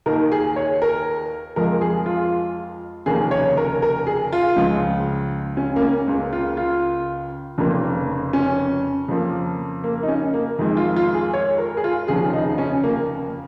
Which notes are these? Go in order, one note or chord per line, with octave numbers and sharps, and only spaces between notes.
D#2 D#3 A#3 A#4
G#4
C#5
A#4
F2 F3 G#3 A#4
G#4
F4
F1 D#2 C#3 A#3 G#4
C#5
A#4
A#4
G#4
F4
C#2 C#3 F3 G#3
C#4
A#3
C#4
C#2 C#3 A#3
F4
F4
F1 F2 C#3 A#3
C#4
F2 C#3 F3 A#3
A#3
D#4
C#4
A#3
F2 D#3 G#3
F4
F4
G#4
C#5
A#4
G#4
F4
F1 D#2 C#3 F3 G#4
D#4
C#4
A#3